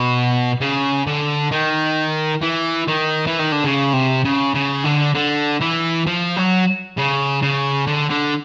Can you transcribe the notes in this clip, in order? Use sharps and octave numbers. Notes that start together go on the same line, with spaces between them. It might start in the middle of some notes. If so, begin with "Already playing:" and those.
Already playing: B2
C#3
D3
D#3
E3
D#3
E3
D#3
D3
C#3
C3
C#3
C#3
D3
D3
E3
F3
F#3
C#3
C#3
D3
D3